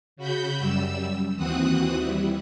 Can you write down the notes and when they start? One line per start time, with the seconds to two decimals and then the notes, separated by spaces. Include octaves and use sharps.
0.16 C#3 F#4 B5 G6
0.58 F#2 G3 E6
1.37 D#2 E3 C4 F#4 D#6 F#6
1.96 G3 E4